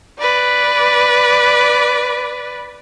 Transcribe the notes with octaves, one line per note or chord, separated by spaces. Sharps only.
B4 D5